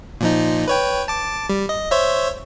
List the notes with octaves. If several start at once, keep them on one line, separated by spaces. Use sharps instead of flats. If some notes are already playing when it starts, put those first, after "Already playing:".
A#2 F3 D#4
B4 C#5 G5
A5 D6
G3
D#5
C5 C#5 E5